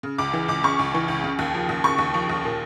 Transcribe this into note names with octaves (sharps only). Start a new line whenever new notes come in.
C#3
C#2 D6
E3
C#2 D6
C#3 C#6
C#2
E3
C#2
C#3
D#2
F3
D#2
C#3 C#6
D#2
F3
D#2
A#2